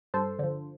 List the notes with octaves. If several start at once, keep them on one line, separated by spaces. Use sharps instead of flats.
G2 A4 C5
D3 F3